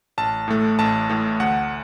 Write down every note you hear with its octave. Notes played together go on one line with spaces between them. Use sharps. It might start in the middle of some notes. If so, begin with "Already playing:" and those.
A1 A5
A2 A3
A1 A5
A2 A3
D2 F#5